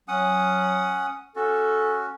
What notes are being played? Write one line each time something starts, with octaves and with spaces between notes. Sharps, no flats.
F#3 C#4 F#5 D#6
C#4 F#4 A4